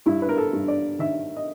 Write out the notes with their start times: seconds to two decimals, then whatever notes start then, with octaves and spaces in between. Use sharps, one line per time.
0.06 G2 E4
0.22 B4
0.29 A#4
0.37 A4
0.53 G2
0.68 D5
0.99 D#3 E5
1.36 D#5